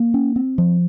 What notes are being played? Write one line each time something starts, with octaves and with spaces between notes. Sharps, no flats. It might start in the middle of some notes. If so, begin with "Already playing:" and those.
Already playing: A#3
C#4
C4
F3